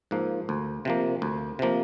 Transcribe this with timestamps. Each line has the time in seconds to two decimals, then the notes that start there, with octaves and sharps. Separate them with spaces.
0.11 G#2 F3 A#3
0.49 D2
0.85 C3 F3 A#3
1.22 D2
1.59 C3 F3 A#3